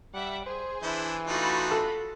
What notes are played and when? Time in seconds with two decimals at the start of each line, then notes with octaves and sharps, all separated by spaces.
0.14 G3 E5 F#5 D6
0.46 G#4 C5
0.82 E3 D4 E4 C5
1.27 A3 D4 D#4 F4 F#4 B5
1.71 A4